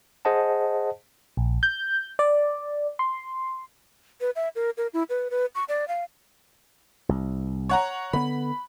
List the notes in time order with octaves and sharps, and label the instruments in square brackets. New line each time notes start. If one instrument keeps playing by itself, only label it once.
[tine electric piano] G#4 C5 D#5 F#5 A5
[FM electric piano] A#1
G6
D5
C6
[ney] B4
E5
A#4
A#4
E4
B4
B4
C#6
D5
F5
[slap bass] C2
[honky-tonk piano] C#5 F#5 A#5
[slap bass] D3 B3 [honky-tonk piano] B5